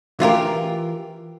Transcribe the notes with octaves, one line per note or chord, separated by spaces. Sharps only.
E3 F4 G4 A#4